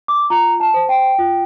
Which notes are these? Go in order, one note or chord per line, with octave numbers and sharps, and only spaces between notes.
D6
F4 A#5
A5
C5
G5
F4